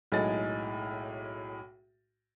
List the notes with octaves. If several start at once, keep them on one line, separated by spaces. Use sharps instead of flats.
B1 A2 G#3 D#4 G#4 A6